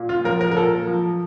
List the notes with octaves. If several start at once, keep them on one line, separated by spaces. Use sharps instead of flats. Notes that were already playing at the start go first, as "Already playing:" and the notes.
Already playing: A#2
F4
F3 A#4
A#4
A#4
A#2 A4
F3